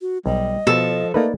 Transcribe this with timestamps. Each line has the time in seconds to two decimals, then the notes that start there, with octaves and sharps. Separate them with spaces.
0.02 F#4
0.26 B1 G3 D#5
0.67 B2 F3 A4
1.14 A3 A#3 D#4 B4 D5